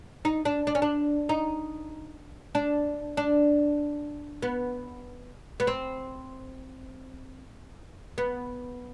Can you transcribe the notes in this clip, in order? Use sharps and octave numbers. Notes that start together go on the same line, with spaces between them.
D#4
D4
D4
C#4
D4
D#4
D4
D4
B3
B3
C4
B3